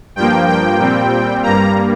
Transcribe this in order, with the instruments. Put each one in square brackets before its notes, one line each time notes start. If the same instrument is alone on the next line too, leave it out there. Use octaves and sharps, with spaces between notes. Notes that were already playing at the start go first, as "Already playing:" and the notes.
[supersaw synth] G2 F3 A#3 G5
G5
A#2 G3 C4
G2 G3 A#3 A#5